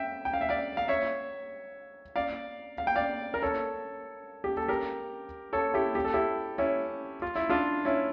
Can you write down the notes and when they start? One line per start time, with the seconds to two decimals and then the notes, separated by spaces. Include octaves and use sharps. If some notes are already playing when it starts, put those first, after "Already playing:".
Already playing: E5 G5
0.25 G5
0.34 F5
0.41 E5
0.49 D5 F5
0.77 F5
0.88 C#5 E5
2.16 D5 F5
2.78 F5
2.87 G5
2.96 D5 F5
3.34 A#4
3.42 A4 C#5
4.44 G4
4.57 A4
4.68 G4 A#4
5.53 A4 C#5
5.74 E4 G4
5.95 G4
6.05 A4
6.14 E4 G4
6.58 C#4 E4
7.22 F4
7.35 E4
7.49 D4 F4
7.85 C#4 E4